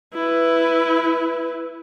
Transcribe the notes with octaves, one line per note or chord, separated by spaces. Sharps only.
E4 B4